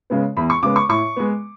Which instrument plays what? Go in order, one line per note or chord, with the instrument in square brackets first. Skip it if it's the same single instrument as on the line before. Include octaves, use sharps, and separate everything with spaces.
[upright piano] C#3 G#3 B3
E2 B5
C#6
C#3 G#3 B3 D6
C#6
A2 C#6
G#3 B3